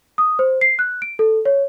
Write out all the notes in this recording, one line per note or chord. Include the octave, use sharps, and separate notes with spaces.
D#6
C5
C7
F#6
D7
A4
C#5